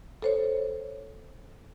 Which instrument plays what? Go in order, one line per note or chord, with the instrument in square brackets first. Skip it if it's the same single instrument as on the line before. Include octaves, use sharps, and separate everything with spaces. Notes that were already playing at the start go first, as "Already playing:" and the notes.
[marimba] A4 C5 C#5